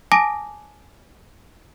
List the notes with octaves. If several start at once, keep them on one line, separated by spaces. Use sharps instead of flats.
G#5 A5 D6 D#6 A#6 D7